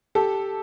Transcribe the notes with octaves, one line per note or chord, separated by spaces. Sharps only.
G4 A4